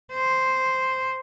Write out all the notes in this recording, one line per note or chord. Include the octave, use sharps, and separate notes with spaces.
C5